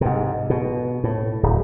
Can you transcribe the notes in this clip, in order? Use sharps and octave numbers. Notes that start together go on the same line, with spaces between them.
G#2 C3
B2
A2
D1